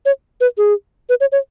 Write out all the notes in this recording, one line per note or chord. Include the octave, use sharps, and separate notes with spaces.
C#5
B4
G#4
B4
C#5
C#5